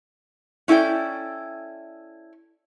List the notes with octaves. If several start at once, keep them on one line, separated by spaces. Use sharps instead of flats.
C#4 E4 A4 D5 G5